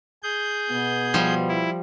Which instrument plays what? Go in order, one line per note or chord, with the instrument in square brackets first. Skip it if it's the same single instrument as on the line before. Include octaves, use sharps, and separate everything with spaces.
[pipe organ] G#4 G6
[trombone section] B2 B3
[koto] F3 G3
[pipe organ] E4